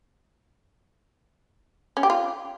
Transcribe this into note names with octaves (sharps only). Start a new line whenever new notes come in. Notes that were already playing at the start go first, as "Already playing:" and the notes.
C#4
G4
F4